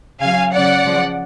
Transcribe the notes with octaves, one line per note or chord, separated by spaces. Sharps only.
C#3 F#3 F5 G#5
C#3 F#3 D5 F#5
C#3 F3